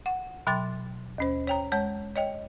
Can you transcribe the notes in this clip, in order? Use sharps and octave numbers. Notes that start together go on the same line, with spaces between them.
F#5
B2 F#3 G5 C6 D6 A6
D#2 C#4 C5
C#5 G5 A#5
G#3 C#5 A5
C#5 D#5 G5